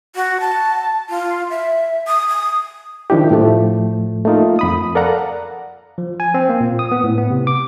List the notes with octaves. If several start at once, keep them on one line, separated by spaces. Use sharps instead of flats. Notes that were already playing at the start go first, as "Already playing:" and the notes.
F#4
A5
F4
E5
D#6
D#6
D#3 F3 D4 E4 G4
A2 F3 A3
A3 A#3 D#4 F4
F2 B5 D#6
A4 A#4 D5 F5 F#5 A#5
F3
G#5
C4
A#3
A#2
D#6
B3
A2
B3
C3
D6